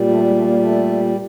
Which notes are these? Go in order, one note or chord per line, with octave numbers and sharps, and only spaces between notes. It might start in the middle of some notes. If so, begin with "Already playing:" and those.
Already playing: A#2 G3
A3
G#3
A3
A#3
A3